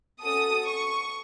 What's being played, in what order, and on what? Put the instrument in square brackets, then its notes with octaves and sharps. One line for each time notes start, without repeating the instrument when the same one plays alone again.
[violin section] C#4 F#4 A4 D#6
C#6